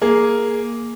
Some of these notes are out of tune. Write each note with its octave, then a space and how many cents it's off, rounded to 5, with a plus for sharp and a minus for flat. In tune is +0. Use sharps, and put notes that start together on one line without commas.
A#3 +0 G#4 +0